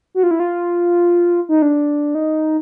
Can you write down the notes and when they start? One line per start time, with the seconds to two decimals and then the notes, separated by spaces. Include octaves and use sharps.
0.15 F#4
0.23 F4
0.31 E4
0.40 F4
1.49 D#4
1.62 D4
2.15 D#4